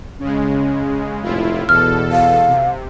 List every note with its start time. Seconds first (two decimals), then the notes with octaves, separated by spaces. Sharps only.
0.20 C#3 G#3 C#4
1.23 F1 A2 E4 F4
1.69 E2 B2 A4 F6
2.12 F5
2.47 C3